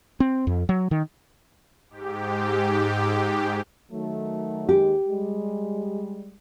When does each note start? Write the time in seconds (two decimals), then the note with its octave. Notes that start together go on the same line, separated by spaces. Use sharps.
0.20 C4
0.47 F2
0.69 F#3
0.91 D#3
1.90 G#2 G4
3.91 D#3 F#3 A3
4.69 D#2 G#3 G4
5.09 G3 G#3